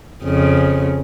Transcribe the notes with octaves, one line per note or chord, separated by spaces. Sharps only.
F2 C#3